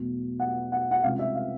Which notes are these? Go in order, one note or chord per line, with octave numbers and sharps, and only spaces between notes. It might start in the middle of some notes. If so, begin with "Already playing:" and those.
Already playing: E2 B2 F#3 A3
F#5
F#5
F#5
C2 C3 F3 G#3 C#4 F5
E5
F5